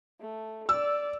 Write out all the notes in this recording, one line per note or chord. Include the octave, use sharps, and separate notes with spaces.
A3
D5 E6